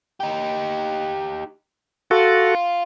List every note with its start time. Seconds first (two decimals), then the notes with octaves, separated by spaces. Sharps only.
0.20 D#4 G4
2.11 F4 F#4 A4